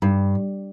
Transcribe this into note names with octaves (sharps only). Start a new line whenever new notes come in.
G2